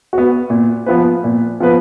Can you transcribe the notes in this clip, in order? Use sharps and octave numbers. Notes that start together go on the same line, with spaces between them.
B3 F#4
A#2
F3 B3 F4 B4
A#2
F3 B3 F4 B4